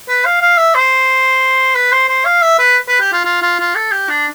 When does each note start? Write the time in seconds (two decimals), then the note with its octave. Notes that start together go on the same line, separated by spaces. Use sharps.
0.08 B4
0.25 F5
0.41 F5
0.57 E5
0.74 C5
1.75 B4
1.92 C5
2.08 C5
2.25 F5
2.42 E5
2.59 B4
2.88 B4
3.00 G4
3.13 F4
3.25 F4
3.42 F4
3.59 F4
3.75 A4
3.92 G4
4.09 D4